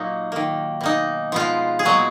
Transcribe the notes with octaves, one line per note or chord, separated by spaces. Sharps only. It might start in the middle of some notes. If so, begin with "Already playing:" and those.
Already playing: A#2 F#3 A#3 D#4
D#3 A#3
B2 A#3 D#4
B2 F3 G#3 B3 F4
G#4
A#2 F#3 G#3 B3 F#4